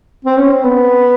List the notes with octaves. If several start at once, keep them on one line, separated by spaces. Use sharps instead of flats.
C4
C#4
C4
B3